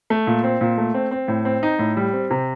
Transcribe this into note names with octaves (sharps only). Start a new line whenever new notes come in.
A3
A#2
C4
A#2
A3
C4
C4
A2
C4
D#4
A2
G3
C4
C3